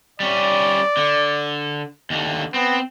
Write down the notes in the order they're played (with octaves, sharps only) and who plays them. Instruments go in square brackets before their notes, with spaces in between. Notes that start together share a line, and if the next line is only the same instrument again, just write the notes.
[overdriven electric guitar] G3 C#4 [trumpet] D5
[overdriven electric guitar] D3
D#2 D3
[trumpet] B3 [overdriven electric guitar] C4